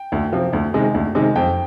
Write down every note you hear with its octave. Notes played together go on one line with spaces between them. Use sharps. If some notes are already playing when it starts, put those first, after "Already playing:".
Already playing: G5
D2
C3 F3
D2
C3 D#3 G#3
D2
C3 D#3 G#3
F2 G5